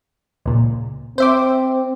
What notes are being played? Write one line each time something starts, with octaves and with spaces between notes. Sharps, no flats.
C#2 A#2
C4 C5 E5 D6